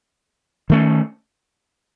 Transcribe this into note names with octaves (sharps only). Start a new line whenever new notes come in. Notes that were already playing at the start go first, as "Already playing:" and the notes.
D#3 A3 C#4